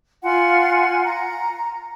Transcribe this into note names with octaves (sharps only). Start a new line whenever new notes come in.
F4 F#5 G#5 C6
A#5